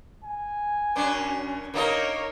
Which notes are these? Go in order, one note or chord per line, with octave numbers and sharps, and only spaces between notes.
G#5
F#2 C#4 D4
A#3 D#4 A#4 C#5 D#5